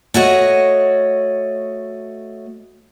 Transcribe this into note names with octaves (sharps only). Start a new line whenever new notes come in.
A3 F#4 C#5 D#5